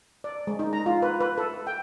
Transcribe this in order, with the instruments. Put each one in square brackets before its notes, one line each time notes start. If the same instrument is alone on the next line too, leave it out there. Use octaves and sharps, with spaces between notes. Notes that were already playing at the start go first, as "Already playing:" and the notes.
[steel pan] D5
G#3
D#4
A#5
F4
B4
B4
A4
G5